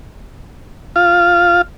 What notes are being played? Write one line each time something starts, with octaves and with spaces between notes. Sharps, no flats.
F4 F5